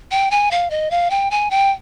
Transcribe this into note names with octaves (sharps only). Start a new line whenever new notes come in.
G5
G#5
F5
D#5
F5
G5
G#5
G5